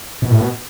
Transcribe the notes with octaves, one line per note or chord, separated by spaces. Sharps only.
B2
A2
B2